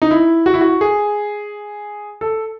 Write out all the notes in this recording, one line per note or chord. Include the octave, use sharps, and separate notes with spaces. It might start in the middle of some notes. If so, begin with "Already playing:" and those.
D#4
E4
F#4
E4
F#4
G#4
A4